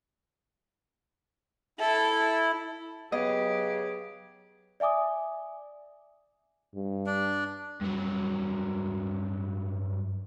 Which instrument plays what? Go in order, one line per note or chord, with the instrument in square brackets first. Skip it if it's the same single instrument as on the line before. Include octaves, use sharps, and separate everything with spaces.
[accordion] E4 [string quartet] A4
[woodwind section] C#3 G#4 [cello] F#3 G4 [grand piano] B3 [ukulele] D#5
[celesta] D5 E5 G#5 D6 D#6
[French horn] G2
[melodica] D4
[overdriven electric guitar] G2 F#3